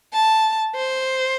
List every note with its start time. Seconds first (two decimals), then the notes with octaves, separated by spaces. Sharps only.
0.13 A5
0.75 C5